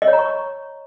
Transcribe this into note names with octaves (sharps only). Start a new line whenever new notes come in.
D#5
C#5
A#5
C#6